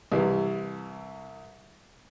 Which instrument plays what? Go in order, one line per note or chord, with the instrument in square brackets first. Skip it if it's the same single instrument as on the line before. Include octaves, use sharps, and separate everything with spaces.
[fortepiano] C2 C3 E3